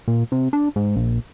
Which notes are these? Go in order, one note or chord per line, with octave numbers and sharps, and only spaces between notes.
A#2
C3
D4
G#2
A#1